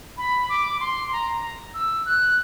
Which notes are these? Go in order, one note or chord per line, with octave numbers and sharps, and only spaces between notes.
B5
D6
C6
A#5
E6
F#6